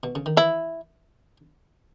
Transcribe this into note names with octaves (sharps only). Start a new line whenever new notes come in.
B2
C#3
D#3
E3 E4